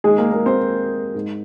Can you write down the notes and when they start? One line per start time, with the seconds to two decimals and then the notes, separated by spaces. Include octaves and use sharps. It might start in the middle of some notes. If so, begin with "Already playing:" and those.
0.04 D#2 D#3 G#3 G#4
0.18 A#3 A#4
0.32 A#3 A#4
0.46 C4 C5
1.15 G#2 G#3